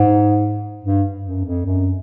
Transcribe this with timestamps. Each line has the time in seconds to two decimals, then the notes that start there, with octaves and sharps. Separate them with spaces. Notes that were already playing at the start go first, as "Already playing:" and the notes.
Already playing: G#2
0.84 G2
1.25 F#2
1.45 F2
1.66 F#2